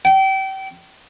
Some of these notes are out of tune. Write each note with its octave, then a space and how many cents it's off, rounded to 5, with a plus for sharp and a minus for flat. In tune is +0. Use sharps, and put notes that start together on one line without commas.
G5 -30